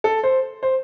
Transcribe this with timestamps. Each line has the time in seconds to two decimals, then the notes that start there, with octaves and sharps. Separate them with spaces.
0.04 A4
0.23 C5
0.63 C5